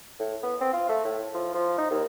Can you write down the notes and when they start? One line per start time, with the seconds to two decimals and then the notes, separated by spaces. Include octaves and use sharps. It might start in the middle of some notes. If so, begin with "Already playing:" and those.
0.19 A2
0.43 B3
0.61 C4
0.73 F4
0.89 A3
1.04 A2
1.35 F3
1.54 F3
1.78 D#4
1.91 D#2